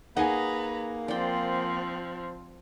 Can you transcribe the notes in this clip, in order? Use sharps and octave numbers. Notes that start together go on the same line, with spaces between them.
A#3 D#4 G#4 B4 D#5 F#5 G#5 A#5
F3 C4 D5 G5